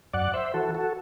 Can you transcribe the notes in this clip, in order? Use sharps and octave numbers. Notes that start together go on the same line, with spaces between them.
F#2 D5 F#5
C5 E5
E3 F#4 A4
F#4 A4